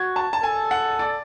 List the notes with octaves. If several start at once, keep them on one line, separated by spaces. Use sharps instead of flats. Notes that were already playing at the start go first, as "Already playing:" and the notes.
Already playing: F#4 G#6
A5
A5
A4 G#5
F#5
D5